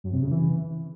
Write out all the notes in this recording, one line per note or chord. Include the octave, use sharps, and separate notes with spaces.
F#2
C3
C#3
E3